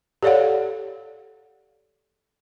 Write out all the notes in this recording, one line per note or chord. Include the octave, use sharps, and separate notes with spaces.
G4 A4 C#5 D5 F5 F#5